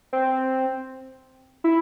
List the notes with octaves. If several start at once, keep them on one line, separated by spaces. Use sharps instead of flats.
C4
E4